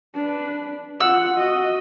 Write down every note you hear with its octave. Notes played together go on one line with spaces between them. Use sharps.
D4 B4
F4 F#5 E6
F#4 D#5